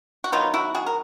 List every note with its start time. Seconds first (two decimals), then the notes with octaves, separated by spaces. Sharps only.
0.24 F#4
0.32 D#3 F#3 B3 D#4 F4
0.54 E4 F#4
0.75 F#4 G#4
0.86 A#4